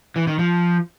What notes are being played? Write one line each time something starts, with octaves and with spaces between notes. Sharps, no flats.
E3
D#3
F3